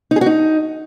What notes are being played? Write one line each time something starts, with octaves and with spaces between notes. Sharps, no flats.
D#4
G#4
F#4
D#4